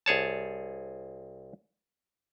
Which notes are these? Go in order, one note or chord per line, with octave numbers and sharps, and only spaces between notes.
C2 G#4 C#5 A5